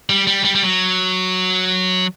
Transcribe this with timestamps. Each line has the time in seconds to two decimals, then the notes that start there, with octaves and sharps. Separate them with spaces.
0.09 G3
0.27 G3
0.45 G3
0.55 G3
0.63 F#3